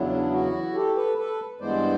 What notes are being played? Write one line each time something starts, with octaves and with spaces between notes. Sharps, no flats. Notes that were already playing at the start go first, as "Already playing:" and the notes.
Already playing: E2 C#3 F#3 B3 D4 E4
E4 F#4
G4 A4
A4 B4
A4 B4
G2 E3 G#3 B3 C5 D5